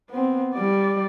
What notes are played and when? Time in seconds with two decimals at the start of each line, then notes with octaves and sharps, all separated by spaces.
0.11 B3 C4
0.55 G3 D5